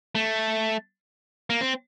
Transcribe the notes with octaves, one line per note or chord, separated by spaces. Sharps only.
A3
A#3
C4